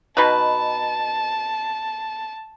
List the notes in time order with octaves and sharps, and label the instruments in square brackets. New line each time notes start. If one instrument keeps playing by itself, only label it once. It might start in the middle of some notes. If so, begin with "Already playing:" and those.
[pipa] B2 D#4 B4 [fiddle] A5